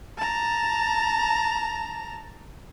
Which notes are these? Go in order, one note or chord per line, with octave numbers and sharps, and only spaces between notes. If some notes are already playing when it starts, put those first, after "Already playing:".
A5 A#5